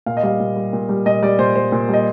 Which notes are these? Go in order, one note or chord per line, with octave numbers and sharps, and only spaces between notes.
A#2 F5
D#5
G3 F5
A#2
G3
A#2
G3
A#2 D#5
G3 D5
A#2 C5
G3 C5
A#2
G3 D#5